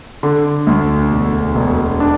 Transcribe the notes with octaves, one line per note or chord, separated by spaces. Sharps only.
D3
D2
E1
E1
D4